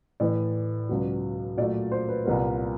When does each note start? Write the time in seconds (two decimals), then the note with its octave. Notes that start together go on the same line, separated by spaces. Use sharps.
0.20 A2 E3 A3 D5
0.89 C#2 B2 F#3
1.57 A#2 F#3 A3 D5
1.92 C5
2.09 B4
2.25 C2 A#2 G3 B3 A#4